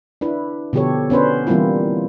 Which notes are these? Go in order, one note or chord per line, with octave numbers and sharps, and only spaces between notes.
D4 E4 B4
B2 D3 F3 G4 A4 C#5
B3 C#4 D4 B4 C5
E3 G3 A#3 C4 E4 F4